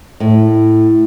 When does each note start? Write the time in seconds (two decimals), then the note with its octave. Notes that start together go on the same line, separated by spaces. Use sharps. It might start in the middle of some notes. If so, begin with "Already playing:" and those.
0.20 A2